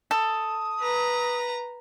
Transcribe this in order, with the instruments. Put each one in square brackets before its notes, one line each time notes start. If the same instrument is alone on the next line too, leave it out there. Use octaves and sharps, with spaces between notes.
[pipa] A4 [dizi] D#6
[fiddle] B4 A#5